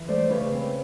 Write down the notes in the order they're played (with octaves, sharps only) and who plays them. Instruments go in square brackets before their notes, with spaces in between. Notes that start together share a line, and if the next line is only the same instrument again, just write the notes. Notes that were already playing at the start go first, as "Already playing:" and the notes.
Already playing: [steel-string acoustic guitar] E3
A3 C5 D5
C#3 B4 C#5
C4